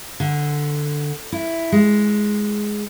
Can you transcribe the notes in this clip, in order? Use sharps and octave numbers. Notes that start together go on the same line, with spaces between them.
D3
E4
G#3